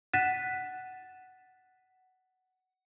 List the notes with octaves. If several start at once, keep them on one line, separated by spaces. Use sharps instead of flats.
F#5 F#6 A6 B6 D#7 E7